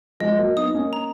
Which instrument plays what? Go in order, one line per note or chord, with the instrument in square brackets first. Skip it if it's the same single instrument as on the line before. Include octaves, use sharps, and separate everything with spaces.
[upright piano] F3 G#3 [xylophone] D#5
[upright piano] F#3 A#3
[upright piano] B3 D#4 [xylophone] D#6
[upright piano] A#3 C#4
[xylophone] A#5